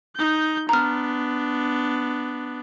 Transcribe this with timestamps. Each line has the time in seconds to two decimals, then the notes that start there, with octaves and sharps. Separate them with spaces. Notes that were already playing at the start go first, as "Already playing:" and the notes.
0.16 D#4 G6
0.69 B3 D4 A#5 F6